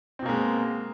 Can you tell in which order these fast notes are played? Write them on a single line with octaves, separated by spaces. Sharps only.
C4 B2 A#3 G#3